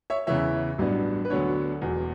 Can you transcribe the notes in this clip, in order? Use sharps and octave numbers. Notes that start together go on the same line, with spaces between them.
C#5 E5
E2 C#3 E3 C#5 E5
A1 G2 F#3 B3 D4
B4
D2 D3 F#3 B3 D4 C#5
E1 E2 B2